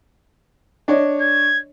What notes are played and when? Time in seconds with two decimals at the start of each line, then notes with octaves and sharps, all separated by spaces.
0.88 D4 C#5 D#5
1.21 G#6